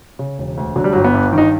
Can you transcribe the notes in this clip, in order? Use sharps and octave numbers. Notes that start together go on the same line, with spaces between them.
C#3
E1
D2
D3 F#3
G3
G1 F#3
B3
G2
D#3
D#4